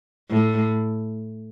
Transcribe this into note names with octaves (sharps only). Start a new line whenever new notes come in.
A2